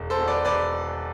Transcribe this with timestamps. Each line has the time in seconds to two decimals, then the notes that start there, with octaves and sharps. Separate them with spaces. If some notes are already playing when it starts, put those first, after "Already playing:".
Already playing: E1
0.10 A4 C5
0.19 E2 B2
0.28 B4 D5
0.45 E1 B4 D5